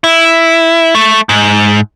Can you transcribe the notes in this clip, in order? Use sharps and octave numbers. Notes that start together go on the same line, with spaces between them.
E4
A3
G#2